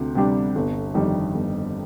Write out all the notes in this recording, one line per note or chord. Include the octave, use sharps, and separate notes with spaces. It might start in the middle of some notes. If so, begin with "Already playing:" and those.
Already playing: D2 C3
C3 G3 D4 G4
G1
F2 D#3 G3
G1